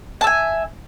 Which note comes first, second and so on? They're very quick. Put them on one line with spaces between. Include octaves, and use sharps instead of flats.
A5 E5 G#5